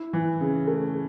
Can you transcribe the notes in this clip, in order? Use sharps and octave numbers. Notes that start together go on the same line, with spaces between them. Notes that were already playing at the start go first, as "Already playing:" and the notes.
Already playing: E4
E3
C#3
A3